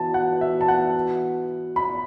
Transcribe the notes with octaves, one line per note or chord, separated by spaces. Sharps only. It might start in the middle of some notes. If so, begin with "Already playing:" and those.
Already playing: E3 B3 F#4 A5
F#5
E5
A5
F#5
B5